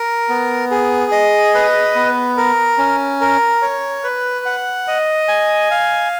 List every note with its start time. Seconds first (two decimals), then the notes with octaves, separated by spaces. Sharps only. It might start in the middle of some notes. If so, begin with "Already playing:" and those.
Already playing: A#4
0.29 B3
0.71 G#4
1.12 D#5
1.54 B4
1.95 B3
2.37 A#4
2.78 C#4
3.21 A#4
3.62 C#5
4.04 B4
4.45 F#5
4.88 D#5
5.28 G#5
5.71 F5